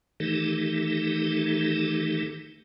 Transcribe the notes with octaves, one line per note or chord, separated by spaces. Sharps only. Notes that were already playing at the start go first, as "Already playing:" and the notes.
D#3 E3 A3 D#4 G4 A4